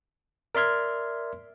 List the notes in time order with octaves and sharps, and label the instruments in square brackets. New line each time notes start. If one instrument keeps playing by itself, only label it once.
[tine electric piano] A#4 D5 E5 C6 F6 G#6